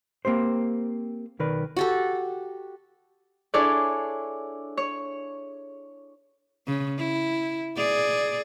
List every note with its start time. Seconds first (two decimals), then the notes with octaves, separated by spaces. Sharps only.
0.25 A#3 C4 G4 C5
1.39 B1 D#3 A#4 B4 D5
1.77 F#4 G4 A4
3.54 D4 E4 G#4 A4 C#5 D5
4.77 C#5
6.67 C#3
6.98 E4
7.77 G#4 D5